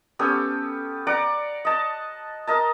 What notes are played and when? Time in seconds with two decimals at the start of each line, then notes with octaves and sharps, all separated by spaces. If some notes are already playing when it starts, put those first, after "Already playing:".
0.19 B3 C#4 G4 A4
1.07 D5 F#5 A#5
1.65 D#5 A5
2.47 A#4 D#5 A5